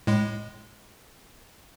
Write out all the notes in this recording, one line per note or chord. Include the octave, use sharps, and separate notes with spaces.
A2 G#3